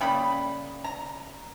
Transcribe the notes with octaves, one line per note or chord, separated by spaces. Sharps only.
C#3 G3 A#3 B5
A#5